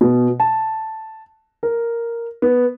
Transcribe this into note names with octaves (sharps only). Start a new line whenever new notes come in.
B2
A5
A#4
B3